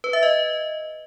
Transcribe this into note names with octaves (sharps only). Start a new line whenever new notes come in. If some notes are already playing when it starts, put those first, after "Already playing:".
B4
E5
D#5